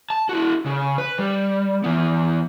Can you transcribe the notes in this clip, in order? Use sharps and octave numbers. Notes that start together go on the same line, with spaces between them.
A5
E4 F#4
C#3
B4
G3
E3 B3